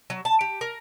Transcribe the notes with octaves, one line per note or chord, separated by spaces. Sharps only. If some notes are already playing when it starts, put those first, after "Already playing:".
F#3
A5
G4
A#4